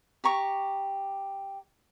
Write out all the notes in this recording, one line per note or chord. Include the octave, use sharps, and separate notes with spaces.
G4 A#5 C#6